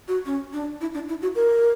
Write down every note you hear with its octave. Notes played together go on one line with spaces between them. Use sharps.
F#4
C#4
D4
E4
D4
E4
F#4
A#4